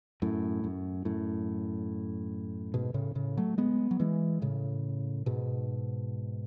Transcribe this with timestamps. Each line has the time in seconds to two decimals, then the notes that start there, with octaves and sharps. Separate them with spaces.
0.22 F#2 A2
0.64 F#2
1.05 F#2 A2
2.74 G#2 B2
2.94 A2 C#3
3.15 A2 C#3
3.37 F#3 A3
3.58 G#3 B3
3.91 F#3
4.00 E3 G#3
4.42 A2 C#3
5.26 G#2 B2